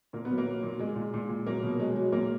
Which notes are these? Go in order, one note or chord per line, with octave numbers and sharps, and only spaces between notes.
A#2 A#3
B3
F#3
A#3
F#3
A#2
A#2 G#3
A#2
A#2
A#2
F#3 A#3
B2
F#3 G#3
F#3
A#2 A#3